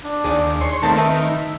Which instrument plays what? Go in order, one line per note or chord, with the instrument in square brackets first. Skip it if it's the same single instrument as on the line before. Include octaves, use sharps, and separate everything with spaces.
[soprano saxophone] D4
[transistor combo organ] D#2 [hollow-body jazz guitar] G#4 D5
[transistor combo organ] C#5 C6
[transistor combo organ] D#3 [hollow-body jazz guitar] A3 A#3 C4 [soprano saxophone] A5
[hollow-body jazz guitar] B4 [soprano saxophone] E5